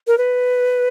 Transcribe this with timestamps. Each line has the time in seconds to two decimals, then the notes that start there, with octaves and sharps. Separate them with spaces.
0.07 A#4
0.18 B4